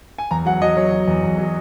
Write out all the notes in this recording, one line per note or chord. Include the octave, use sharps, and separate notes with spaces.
G#5
E2 A#5
F#3 F#5
F#3 D#5
F#3 C#5
F#3
E2
E2
F#3